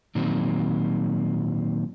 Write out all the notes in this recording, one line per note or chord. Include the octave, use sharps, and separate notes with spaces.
A#2 D#3 F#3 C4